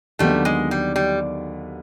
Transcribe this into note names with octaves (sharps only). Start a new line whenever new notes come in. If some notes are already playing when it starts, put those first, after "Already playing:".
D#2 D3 F#3 G3 A3 B3
G#3
G3
G3